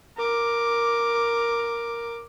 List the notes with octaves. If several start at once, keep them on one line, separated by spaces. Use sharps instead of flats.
A#4 D6